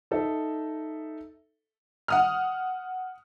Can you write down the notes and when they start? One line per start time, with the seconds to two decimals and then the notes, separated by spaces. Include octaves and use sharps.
0.11 D#4 A4 E5
2.08 F#5 D#6 F6